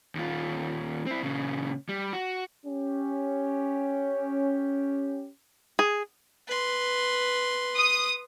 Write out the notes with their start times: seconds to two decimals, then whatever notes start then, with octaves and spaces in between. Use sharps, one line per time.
0.15 D#2 F4
1.07 C4 E4
1.23 A#2 C#3
1.89 G3
2.13 F#4
2.66 C#4 G4
5.79 G#4
6.47 B4 C6
7.75 D#6